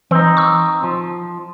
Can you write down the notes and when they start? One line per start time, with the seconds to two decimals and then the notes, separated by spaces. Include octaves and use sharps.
0.11 E3 C4 D#4
0.37 C#6 E6
0.84 F3